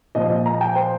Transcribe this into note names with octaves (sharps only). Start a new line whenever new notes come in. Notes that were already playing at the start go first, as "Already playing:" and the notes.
A#2 F3 D#5
D#5
A#5
G5
C5